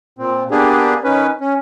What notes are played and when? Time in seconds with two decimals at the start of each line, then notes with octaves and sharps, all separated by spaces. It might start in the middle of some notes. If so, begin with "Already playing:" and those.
0.19 A#2 C4
0.51 A#3 B3 D4 G4 G#4
1.04 D#3 C#4 B4
1.41 C#4